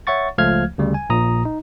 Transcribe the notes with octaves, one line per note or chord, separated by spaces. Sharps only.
C#5 E5 F#5 C#6 A6
C#2 F3 A3 F5 F6 G#6
D2 C#3 G3
G#5
A#1 A#2 A#5 D#6
D#4